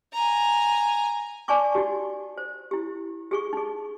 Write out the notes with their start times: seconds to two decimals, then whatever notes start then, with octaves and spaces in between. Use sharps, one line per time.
0.13 G#5 A#5
1.48 D5 G#5 A5 C#6 D6
1.75 D#4 F#4 G4
2.38 C5
2.71 E4 G4
3.31 G4 G#4 C#6
3.53 D#4 G#4